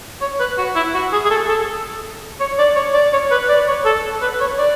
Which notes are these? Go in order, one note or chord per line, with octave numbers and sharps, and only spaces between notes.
C#5
B4
F#4
E4
F#4
G#4
G#4
A4
A4
C#5
D5
C#5
D5
C#5
B4
D5
C#5
A4
B4
C#5
D5